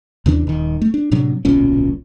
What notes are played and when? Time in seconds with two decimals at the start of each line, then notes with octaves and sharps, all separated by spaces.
0.26 D#2 C#3 E3 D4
0.47 D#1 D#3
0.82 A3
0.94 D4
1.12 A2 C3 F#3 D4
1.45 D1 B1 A#2 C#4